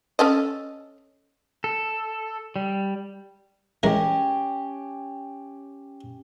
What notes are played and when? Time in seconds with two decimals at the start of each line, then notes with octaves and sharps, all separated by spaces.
0.19 C#4 A4 D#5
1.64 A4
2.56 G3
3.83 E3 G#3 C#4 G4 A#4